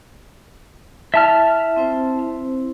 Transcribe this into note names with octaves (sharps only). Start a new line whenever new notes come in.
E4 E5 A5 F6
C4 E4 C5